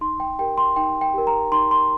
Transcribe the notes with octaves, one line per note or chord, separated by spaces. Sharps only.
D#4 C6
G5
G4 A#4 G5
C6
D#4 G5
G5
G4 A#4
A#5
D#4 C6
C6